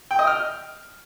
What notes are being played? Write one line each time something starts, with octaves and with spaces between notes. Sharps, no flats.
G5
D#5
F6